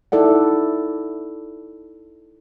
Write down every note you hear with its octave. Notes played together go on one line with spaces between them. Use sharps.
D#4 E4 A4 D5 F#5